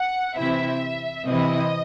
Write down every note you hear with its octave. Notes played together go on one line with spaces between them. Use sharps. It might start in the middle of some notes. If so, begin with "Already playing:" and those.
Already playing: F#5
C3 E3 C4 E4 E5
C3 E3 C4 E4 D#5